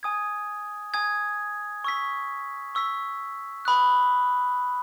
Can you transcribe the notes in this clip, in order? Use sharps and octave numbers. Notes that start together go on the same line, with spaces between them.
G#5 D#6 G#6
G#5 D#6 G#6
C#6 E6 B6
C#6 E6 B6
B5 D#6 F#6